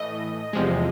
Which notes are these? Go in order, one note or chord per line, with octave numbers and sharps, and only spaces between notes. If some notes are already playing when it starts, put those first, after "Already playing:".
Already playing: A2 E3 A3 D#5
E2 C3 F3 G#3